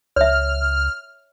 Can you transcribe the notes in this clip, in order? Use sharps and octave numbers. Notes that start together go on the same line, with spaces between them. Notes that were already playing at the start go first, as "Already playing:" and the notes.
C#2 C#5 E5 F6